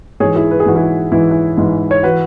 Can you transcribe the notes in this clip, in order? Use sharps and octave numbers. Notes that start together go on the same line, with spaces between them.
G#2 E3 G#4 C#5
E4 G#4
B4
G#4
G#2 E3 F#4
E4 G#4
G#2 E3 E4
E4
G#2 E3
C#5
E3 F#4 B4